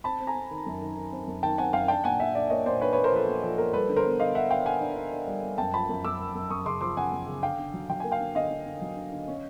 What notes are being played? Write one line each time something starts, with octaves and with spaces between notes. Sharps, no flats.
C4 A5 B5
C4
G#5 A#5
C4
D#3
F#2
D#3
D#3
C4
F#2
D#3 G5 A5
C4 F#5 G#5
F#2 F5 G5
D4 G5 A5
A#2 F#5 G#5
D4 E5 F#5
D4 D5 E5
A#3 C#5 D#5
A#2 C5 D5
D4 B4 C#5
B4 C#5
A#3
A#4 C5
F3 A4 B4
A#3
F3 A4
A#3 A#4
G3 A4 B4
D3
A#4 C5
B3
D3 D#5 F5
D4 E5 F#5
D4 F5 G5
D4 F#5 G#5
D4
D4
D4
G3
G3
F#2 G5 A5
F3 A5 B5
F#2
F#2 D6 E6
F#2
F#2
F#2 C#6 D#6
C#3 C6 D6
F3 C6 D6
C#3 F#5 G#5
F#2
C#3
D3 F5 G5
D3
F#3
F#3 G5
A#3 G#5
F5 G5
D3
D3 D#5 F5
D3
D3
F#3
D3
D3
C#4